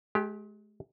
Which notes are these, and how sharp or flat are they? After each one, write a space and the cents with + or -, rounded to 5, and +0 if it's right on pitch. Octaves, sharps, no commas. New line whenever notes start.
G#3 +35 G4 +0